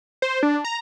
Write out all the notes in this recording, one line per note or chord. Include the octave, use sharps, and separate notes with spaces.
C5
D4
A#5